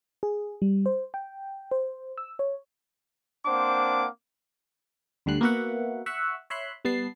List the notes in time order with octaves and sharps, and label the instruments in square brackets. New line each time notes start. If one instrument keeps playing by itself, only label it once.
[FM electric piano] G#4
G3
C5
G5
C5
E6
C#5
[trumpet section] A#3 C4 D4 C5 F#5 D6
[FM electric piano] D2 D3 G3 F#6 C7
A#3 B3 F#4 E5 F#5
E5 F#5 C#6 E6 F#6
C#5 E5 B5 C6 F#6
G3 B3 A5 C7